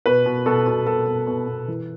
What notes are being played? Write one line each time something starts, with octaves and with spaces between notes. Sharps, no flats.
B2 B4
B2
B2 A4
B2
B2 A4
B2
B2
B2
E3